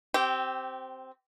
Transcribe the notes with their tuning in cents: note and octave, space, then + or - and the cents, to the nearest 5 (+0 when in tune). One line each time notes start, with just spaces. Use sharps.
C4 +0 G4 -25